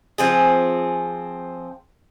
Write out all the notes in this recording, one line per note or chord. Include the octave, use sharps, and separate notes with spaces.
F3 C4 G#4